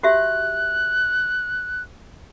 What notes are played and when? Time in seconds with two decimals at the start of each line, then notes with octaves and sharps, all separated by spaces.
0.03 F#4 G4 E5 F#6